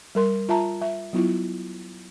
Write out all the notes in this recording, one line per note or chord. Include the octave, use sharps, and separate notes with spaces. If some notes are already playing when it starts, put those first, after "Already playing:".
G3 A#4 C6
F4 E5 A5 A#5
E5
F#3 B3 E4 F4